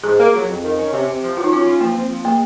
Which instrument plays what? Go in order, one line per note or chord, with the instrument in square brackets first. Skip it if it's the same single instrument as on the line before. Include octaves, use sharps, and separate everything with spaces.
[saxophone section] G#2 [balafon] G#4
[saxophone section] A#3
F#3
F2
D#3
C#4
C3
C3
F3
[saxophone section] F#3 [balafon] F4
[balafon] D#4
[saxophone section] C#4 [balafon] F4
[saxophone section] F4
[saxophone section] F3 [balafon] A#3
[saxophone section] C4
F3
[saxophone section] G#3 [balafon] A#3